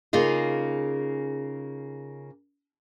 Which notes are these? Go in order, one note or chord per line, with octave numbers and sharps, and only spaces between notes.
C#3 A#3 D#4 F4 G#4